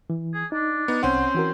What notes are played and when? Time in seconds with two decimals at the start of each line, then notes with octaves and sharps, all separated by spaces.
0.10 E3
0.34 G#4
0.52 D4 D#4
0.88 B3 D#4
1.03 C2 C4 C#4 C5 F#5
1.35 E3 F#4 A#4